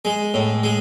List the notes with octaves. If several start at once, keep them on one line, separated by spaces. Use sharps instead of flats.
G#3
A2
G#3